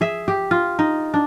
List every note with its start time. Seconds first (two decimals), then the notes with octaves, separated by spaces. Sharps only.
0.01 G#4 E5
0.28 G4
0.51 F4
0.79 D#4
1.14 D4